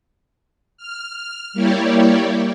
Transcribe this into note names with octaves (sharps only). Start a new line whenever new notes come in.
F6
G3 A#3 E4 G4 C#5 D5